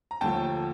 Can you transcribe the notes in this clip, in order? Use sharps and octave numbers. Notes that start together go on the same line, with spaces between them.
A#5
D#2 D3 F3 A3 G5 A5